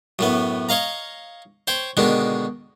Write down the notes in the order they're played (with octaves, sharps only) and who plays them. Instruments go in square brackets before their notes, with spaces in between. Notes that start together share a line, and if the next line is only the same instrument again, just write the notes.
[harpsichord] F#2 A2 B3
C#5 D#5 F5 A#5
C5 C#5 G5
B2 D3 D#3 G#3